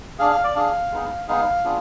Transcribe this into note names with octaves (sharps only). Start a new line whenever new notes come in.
D4 G#4 F5
F5
D5
D4 G#4 F5
G#3 B3 D#4 G#4
G#3 B3 D#4 G#4 F5
B3 D4 F4 G#4